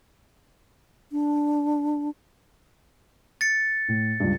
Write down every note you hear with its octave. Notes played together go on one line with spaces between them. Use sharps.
D4
A6 C#7
A2
C#2 G2